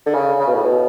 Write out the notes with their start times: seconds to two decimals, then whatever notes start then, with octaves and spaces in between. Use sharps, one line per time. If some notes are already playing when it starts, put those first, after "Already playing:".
0.06 D3
0.14 C#3
0.40 C#3
0.47 B2
0.55 A2
0.64 B2